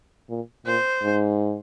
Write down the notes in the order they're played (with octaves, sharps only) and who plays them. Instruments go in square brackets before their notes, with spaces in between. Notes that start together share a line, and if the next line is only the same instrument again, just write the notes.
[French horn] A#2
[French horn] A#2 [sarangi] C5
[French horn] G#2